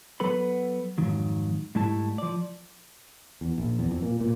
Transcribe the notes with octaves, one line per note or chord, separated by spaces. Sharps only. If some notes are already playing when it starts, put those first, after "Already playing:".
F#3 B3 A4 B4 B5
F2 G#2 D#3 F#3
G#2 G3 A3 E4 A5
F3 D5
E2
A#1
E2
F2
A#2
A#2